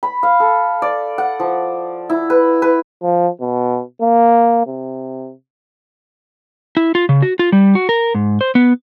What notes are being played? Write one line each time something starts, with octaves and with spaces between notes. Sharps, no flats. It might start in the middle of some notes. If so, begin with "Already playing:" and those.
B5
F5
A4
D5
F#5
F3
E4
B4
B4
F3
B2
A#3
C3
E4
F4
C#3
F#4
F4
G3
F#4
A#4
G#2
C5
B3